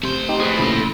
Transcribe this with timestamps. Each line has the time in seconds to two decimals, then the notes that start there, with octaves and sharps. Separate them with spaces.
0.03 C3 A3 C5
0.29 C4 D#4 G4
0.40 G#4 B4
0.59 A#2 C#3 E3 A4 B5